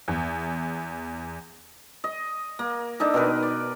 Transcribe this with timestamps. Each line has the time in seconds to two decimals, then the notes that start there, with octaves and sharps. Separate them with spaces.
0.08 E2
2.04 D#5
2.59 A#3
3.00 D4 D#4 A4
3.14 B2 D#3 A#4 B4
3.43 D5